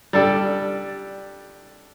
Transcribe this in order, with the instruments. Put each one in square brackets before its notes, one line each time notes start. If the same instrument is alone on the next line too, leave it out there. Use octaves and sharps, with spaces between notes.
[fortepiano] G3 D4 A4 D5